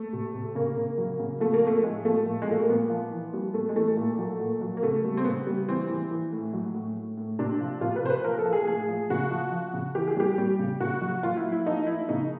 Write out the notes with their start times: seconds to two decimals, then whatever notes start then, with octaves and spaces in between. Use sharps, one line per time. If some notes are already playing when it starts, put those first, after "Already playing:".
Already playing: A3
0.13 C3
0.34 C3
0.55 C#3 A#3
0.77 C#3
0.98 F#3
1.19 C#3
1.40 F3 A3
1.54 A#3
1.63 F3 A3
1.83 A2 G#3
2.05 F3 A3
2.26 A#2
2.42 G#3
2.48 F3 A3
2.59 A#3
2.69 A#2 B3
2.90 F3
3.11 E3
3.33 G3
3.54 A2 A3
3.69 G#3
3.76 E3 A3
3.97 A#2
4.19 F#3
4.39 A#2
4.61 F#3
4.77 A#3
4.83 C#3 A3
5.04 G3
5.17 C4
5.25 C#3 B3
5.47 G3
5.68 E3 C4
5.89 E3
6.11 E3
6.33 A2
6.53 F#3
6.74 A2
6.97 A2
7.17 A2
7.39 C3 D4
7.61 F3
7.81 C3 F4
7.96 B4
8.03 C3 C5
8.10 B4
8.24 F3 A#4
8.39 A4
8.45 F3
8.53 G#4
8.67 A2 G#4
8.89 F3
9.10 C#3 F#4
9.31 F3
9.52 F3
9.73 C#3
9.95 E3 G4
10.08 G#4
10.16 G3 G4
10.38 G3
10.59 C#3
10.80 C#3 F#4
11.02 F#3
11.23 F#3 F4
11.37 E4
11.45 F#3
11.52 E4
11.66 F3 D#4
11.87 F3 E4
12.09 C#3 D#4